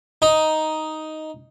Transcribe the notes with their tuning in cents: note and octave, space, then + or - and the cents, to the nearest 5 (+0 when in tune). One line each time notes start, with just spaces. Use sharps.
D#4 +5